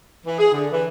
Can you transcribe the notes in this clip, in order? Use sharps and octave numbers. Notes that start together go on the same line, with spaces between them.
E3
G#4
D3
E3